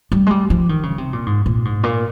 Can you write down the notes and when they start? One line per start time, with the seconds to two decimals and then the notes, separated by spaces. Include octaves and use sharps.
0.12 G3
0.26 G#3
0.31 G3
0.50 F3
0.69 D#3
0.83 C#3
0.98 C3
1.13 A#2
1.26 G#2
1.46 A#2
1.65 G#2
1.83 A#2